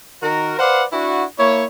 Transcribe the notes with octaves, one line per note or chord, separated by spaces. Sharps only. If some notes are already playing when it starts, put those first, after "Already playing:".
D#3 F#4 A#4
B4 C5 D5 F5 F#5
D4 E4 F#4
A#3 E4 C#5